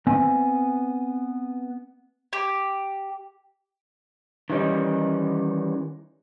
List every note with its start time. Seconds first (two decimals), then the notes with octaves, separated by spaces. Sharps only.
0.07 B3 C4 E5 G#5
2.33 G4
4.50 D#3 E3 G3 C#4 D#4